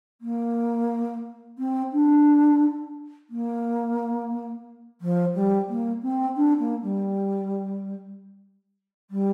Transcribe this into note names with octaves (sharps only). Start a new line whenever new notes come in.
A#3
C4
D4
A#3
F3
G3
A#3
C4
D4
A#3
G3
G3